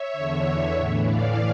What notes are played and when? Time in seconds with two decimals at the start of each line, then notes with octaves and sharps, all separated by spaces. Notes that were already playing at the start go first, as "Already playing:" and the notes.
Already playing: C#5 E5
0.13 E2 D3
0.75 A2 E3
1.05 D5 F5